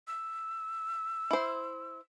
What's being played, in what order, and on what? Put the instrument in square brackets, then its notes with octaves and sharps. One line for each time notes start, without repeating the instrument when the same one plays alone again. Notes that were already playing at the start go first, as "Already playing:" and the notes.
[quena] E6
[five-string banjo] E4 C5